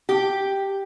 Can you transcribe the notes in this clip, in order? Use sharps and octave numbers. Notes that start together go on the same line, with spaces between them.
G4